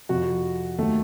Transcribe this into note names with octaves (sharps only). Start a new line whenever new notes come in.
F2 C3 F3 F#4
D#2 D#3 F#3 A3